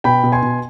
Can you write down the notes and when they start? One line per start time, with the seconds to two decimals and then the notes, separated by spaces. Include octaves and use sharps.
0.04 B2 G5 B5
0.23 B2
0.32 G#5 C6
0.43 B2